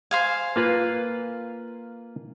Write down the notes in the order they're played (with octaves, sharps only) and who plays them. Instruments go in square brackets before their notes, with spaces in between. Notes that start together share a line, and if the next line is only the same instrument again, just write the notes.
[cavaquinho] C5 F5 G#5
[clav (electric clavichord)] A#3 F4 B4